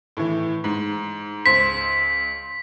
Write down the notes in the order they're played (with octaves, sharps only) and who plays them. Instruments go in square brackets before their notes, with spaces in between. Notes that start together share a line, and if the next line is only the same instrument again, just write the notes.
[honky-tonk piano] A2 E3
G#2
[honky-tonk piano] C#2 C5 [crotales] B6